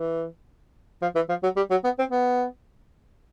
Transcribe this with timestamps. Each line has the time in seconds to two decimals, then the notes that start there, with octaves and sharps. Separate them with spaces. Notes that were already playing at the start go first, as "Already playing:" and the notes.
Already playing: E3
1.02 F3
1.15 E3
1.29 F3
1.43 F#3
1.57 G3
1.71 F#3
1.84 B3
1.99 C4
2.12 B3